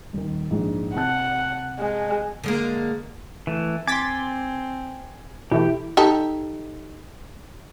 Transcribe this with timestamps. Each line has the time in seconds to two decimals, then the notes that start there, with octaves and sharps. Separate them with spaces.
0.13 D#1 D#3
0.51 A#1 G#2
0.96 C3 F#5 A5 F#6
1.79 G#3
2.44 D3 G#3 A#3
3.47 E3 A3
3.87 C4 G#5 C6 D6 A6 B6
5.52 B2 E3 A3 E4 G4
5.97 D#4 G4 A4